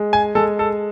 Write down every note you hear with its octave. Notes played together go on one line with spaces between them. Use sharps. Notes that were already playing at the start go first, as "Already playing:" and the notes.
Already playing: G#3
G#5
G#3 A4
A4